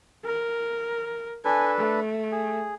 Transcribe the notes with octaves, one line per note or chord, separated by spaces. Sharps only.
A#4
D4 A4 B4 G#5
A3
G#4